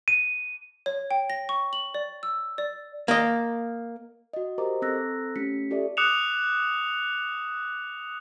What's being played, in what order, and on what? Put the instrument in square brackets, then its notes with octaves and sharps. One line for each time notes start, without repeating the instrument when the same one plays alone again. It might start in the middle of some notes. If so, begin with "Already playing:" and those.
[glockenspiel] D#7
[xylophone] C#5
G5
A#6
C#6
F#7
D5
E6
D5
[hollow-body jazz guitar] A#3 D#5
[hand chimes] F#4 D#5
G4 A#4 C5 D#5 A#5 D6
C4 A4 A#5 E6 F#6 A#6
A3 C#4 G4 B6 C#7
F4 G4 A4 D5 E5
[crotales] D6 D#6 F#6 C#7 E7 F7